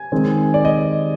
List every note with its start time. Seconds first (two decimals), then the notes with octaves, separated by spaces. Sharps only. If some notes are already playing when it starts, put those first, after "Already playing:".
Already playing: G#5
0.12 D#3 G#3 C4
0.54 D5
0.65 D#5